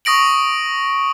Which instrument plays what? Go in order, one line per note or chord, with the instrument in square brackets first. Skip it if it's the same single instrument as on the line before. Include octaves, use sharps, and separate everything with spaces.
[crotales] C#6 D#6 A#6 D7 F#7